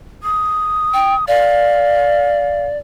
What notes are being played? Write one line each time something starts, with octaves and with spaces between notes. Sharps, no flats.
D#6
G5
D5 F5